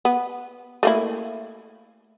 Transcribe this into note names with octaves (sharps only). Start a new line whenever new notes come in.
B3
A3 A#3 E4